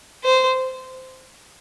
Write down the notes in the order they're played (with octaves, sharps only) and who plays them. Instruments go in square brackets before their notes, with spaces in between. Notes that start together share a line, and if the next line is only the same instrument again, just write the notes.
[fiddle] C5